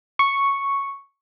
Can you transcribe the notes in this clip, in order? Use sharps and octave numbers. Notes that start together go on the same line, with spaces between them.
C#6